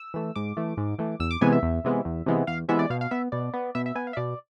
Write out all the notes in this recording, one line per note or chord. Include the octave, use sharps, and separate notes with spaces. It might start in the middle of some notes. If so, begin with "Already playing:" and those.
Already playing: E6
E3 A3
G#2 D6
E3 A3
G#2
E3 A3
E2 E6
D6
C3 E3 G#3 B3 G#5
E5
E2
C3 E3 G#3 B3
E2
C3 E3 G#3 B3
E2 F5
C3 E3 G#3 B3 E5
D5
B2 F5
F5
B3 E5
B2 D5
B3
B2 E5
E5
B3 G#5
F5
E5
B2 D5